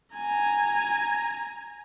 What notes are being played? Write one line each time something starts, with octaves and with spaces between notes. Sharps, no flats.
G#5 A#5